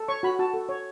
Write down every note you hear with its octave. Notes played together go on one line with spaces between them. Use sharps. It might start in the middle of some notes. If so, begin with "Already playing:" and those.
Already playing: A4
C#5 C#6
F#4 B5
F#4 A5
A4
C#5